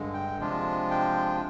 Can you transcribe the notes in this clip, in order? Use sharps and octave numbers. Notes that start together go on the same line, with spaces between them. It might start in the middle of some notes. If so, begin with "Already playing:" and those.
Already playing: G2 D3 G#3
G5
C3 F3 G#3 D4 F4
G5